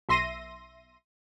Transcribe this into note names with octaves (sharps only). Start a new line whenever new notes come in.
B1 E5 C6 A#6 D#7